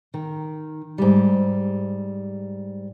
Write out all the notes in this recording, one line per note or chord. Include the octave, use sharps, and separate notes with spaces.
D#3
G#2 G3